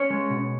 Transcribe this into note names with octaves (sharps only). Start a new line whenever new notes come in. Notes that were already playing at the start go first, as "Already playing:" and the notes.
Already playing: C#4 C#5
G#3
B2